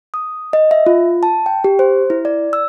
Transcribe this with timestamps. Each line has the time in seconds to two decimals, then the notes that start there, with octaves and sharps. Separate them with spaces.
0.14 D#6
0.53 D#5
0.71 E5
0.86 F4
1.23 A5
1.46 G5
1.64 G4
1.79 C5
2.10 E4
2.25 D5
2.53 E6